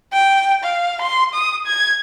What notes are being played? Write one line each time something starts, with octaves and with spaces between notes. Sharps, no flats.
G5
F5
C6
D#6
G#6